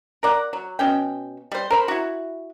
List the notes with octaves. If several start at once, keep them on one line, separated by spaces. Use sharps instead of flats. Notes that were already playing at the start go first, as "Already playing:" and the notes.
A#4 D5 F#5
F#3
B2 C#4 G5
G3 C5
A#4 C5 B5
E4 F#4